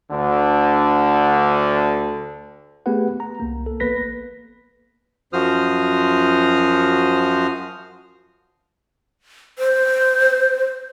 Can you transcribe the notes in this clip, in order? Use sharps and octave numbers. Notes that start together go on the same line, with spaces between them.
D2 D3
A3 B3 G4 G#4 B4 F#5
A#5
C2 A#3
A4
A1 A#3 B3 B4 A#6 B6
F#2 F3 F#4 C5 D#6 F6
C5